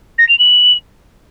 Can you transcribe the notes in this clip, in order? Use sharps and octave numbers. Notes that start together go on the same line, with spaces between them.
A#6
F7
F#7